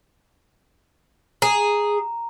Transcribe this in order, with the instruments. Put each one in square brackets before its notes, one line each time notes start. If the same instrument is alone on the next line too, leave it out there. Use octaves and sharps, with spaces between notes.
[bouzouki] G#4 [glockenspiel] A#5